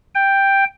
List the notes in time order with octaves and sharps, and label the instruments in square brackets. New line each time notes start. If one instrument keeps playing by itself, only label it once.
[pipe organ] G5